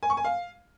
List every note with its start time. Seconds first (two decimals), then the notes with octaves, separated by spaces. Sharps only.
0.03 G#5
0.10 C#6
0.17 G#5
0.24 F5